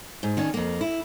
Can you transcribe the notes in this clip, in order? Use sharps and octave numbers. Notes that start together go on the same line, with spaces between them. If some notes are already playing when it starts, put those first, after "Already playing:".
G#2
D#3 C#4 D4
F2 A#3
E4